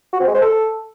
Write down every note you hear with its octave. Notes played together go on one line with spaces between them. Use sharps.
F#4
C4
G#3
C5
A4